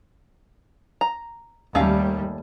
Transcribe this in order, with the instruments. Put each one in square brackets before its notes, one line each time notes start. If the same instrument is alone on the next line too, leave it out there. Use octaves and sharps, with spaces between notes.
[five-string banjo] A#5
[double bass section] D#2 G3 [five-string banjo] A3 C#4 F5